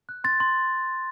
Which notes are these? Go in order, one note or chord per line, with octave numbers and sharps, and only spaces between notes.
F#6
C6 A6
C6